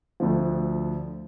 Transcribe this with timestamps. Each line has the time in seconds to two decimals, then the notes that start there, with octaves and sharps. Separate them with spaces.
0.20 D2 D3 F3